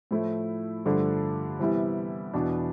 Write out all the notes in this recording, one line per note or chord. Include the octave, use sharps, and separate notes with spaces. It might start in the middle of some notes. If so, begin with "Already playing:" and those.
A2 F3 A3 E4
G2 D3 F3 A3 D4
C3 E3 G3 B3 E4
E2 B2 B3 D4